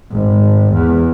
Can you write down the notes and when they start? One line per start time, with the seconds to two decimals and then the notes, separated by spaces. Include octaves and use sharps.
0.11 G#1
0.73 E2